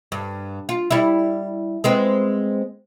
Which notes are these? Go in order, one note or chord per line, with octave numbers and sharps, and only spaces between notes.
G2
F4
G3 E4
G#3 B3 C4